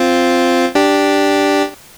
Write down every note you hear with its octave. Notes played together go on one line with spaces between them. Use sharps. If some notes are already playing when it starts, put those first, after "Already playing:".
Already playing: C4 F4
D4 G4